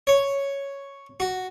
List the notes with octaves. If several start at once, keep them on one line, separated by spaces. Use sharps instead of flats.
C#5
F#4